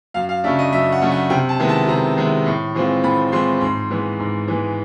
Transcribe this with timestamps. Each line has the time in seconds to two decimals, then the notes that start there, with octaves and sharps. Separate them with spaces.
0.14 F#2 F5
0.29 F5
0.44 C#3 F#3 A3 D4 E5
0.59 D#5
0.72 F#2 E5
0.92 F#5
1.01 C#3 F#3 A3 D4
1.12 F#5
1.30 C3 G5
1.49 A5
1.59 D#3 G#3 B3 E4
1.69 A5
1.88 C3 A#5
2.17 D#3 G#3 B3 E4
2.46 A2
2.75 E3 G#3 C4 F4
3.03 A2 B5
3.32 E3 G#3 C4 F4 C6
3.61 G#2 C6
3.90 E3 G#3 B3
4.19 G#2
4.48 E3 G#3 B3